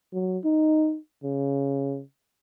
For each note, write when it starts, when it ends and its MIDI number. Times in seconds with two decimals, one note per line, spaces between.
0.13 0.38 54
0.45 0.97 63
1.24 2.02 49